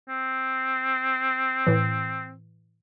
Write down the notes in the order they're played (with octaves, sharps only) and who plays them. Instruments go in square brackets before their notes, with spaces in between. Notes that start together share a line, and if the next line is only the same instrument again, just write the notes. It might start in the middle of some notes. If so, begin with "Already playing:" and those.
[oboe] C4
[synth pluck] A2 E3